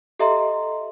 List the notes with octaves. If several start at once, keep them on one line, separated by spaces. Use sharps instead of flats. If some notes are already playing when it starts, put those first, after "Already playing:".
G4 A4 D#5 E5 A#5 C6